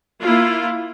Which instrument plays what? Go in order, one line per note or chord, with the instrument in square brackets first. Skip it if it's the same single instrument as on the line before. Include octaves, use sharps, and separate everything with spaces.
[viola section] A#3 E4 F4